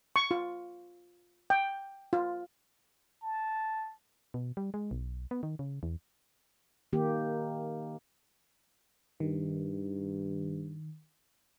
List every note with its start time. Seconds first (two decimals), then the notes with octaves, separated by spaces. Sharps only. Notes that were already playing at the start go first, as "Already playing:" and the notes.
0.16 C#6
0.31 F4
1.50 G5
2.13 F4
3.22 A5
4.34 B2
4.57 G3
4.74 G#3
4.91 B1
5.31 B3
5.43 D#3
5.59 C#3
5.83 E2
6.93 D#3 A#3 G4
9.20 G2 D#3